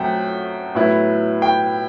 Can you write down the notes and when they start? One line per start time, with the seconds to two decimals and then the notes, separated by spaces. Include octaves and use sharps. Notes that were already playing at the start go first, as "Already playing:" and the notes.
Already playing: F#2 F#3 A3 C4 E5 F#5 G5
0.75 A2 F#3 B3 E4
1.42 G5